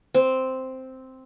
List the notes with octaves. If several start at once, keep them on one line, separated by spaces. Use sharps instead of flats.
C4